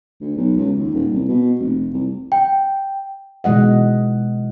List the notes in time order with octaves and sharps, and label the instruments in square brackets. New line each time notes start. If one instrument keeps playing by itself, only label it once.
[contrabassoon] D2
B1
C#2
D#2
D#1
C2
B2
F1
C2
[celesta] G5
[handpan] B2 E3 G#3 D#5 F#5